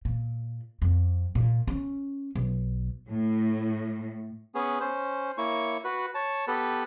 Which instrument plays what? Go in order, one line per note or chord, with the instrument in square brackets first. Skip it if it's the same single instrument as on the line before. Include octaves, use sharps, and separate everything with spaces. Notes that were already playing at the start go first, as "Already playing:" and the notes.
[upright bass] A#2
F2
A#2
C#4
B1
[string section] A2
[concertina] B3 C#4 G#4
C#4 C5
A#3 E4 C#5 C#6
F#4 B4
C#5 A5
B3 G4 A4 B4